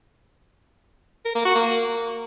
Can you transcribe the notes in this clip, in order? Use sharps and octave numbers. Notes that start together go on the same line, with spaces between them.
A#4
A#3
F#4
A#3